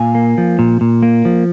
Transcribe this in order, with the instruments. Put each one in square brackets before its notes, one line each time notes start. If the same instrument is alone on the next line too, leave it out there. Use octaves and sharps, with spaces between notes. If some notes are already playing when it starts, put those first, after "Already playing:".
Already playing: [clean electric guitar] A#2 F5 G#5
A#3
F3
A#2
A#2
A#3
F3